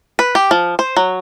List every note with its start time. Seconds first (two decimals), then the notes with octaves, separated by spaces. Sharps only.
0.19 B4
0.35 G4
0.51 F3
0.79 C5
0.97 F#3